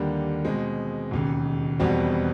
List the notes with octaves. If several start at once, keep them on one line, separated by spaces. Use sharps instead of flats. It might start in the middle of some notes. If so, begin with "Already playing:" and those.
Already playing: D#2 D3 G3 A#3
B2 G#3 C4
E1 D#2 C#3
E1 E2 B2 G3 C4